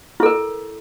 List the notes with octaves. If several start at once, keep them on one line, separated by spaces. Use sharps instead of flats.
E4 A4 A#4